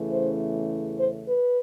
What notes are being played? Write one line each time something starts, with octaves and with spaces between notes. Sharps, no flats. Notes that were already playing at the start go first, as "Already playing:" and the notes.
Already playing: E2 C#3 E3 A3 C#4
C5
C5
B4